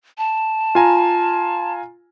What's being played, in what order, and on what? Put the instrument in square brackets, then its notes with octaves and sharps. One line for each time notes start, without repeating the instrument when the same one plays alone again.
[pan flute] A5
[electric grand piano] F4 G#5 A#5